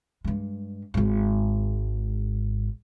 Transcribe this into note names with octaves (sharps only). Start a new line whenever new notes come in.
G2 G#3
G#1 G#2